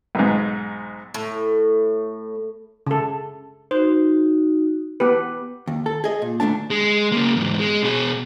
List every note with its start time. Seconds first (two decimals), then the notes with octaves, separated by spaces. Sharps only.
0.15 B1 G#2
1.14 A2
2.87 C#3 A4
3.71 D#4 F#4 C5
5.00 B3 G4 B4 D6
5.67 D#2
5.86 A4
6.04 G#4 D#5
6.22 A#2
6.40 D2 F#3 A3 D4 A5
6.70 G#3
7.12 C#3 A#3
7.36 E2 G#2
7.59 G#3
7.83 B2 G#4